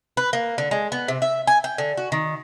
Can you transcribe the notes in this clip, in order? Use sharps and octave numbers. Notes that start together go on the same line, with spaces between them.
B4
A#3
D3
G#3
B3
C3
E5
G#5
G5
D3
F#4
D#3